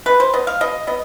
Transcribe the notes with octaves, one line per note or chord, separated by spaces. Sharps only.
B2 B4
C5
B3 D#5
F5
B2 D#5
B3 D#5